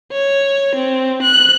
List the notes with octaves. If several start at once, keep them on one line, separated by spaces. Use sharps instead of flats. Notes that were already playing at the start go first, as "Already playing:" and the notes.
C#5
C4
F#6